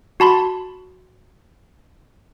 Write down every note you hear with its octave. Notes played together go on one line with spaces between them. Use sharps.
F#4 A5 B5 C6